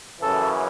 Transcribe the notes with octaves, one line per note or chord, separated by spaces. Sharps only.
F#2 C#3 E3 A4